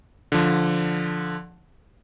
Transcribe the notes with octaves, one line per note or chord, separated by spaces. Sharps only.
D3 F3